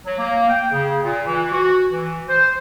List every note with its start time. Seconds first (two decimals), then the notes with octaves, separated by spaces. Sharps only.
0.05 F#3
0.18 A#3
0.49 G5
0.72 C#3
1.02 A#2
1.26 E3
1.52 F#4
1.92 E3
2.28 C5